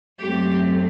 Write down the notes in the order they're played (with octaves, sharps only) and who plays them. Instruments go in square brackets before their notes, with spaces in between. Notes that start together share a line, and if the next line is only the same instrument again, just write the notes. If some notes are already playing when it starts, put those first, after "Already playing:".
[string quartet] F#2 F#3 A3 C4 G4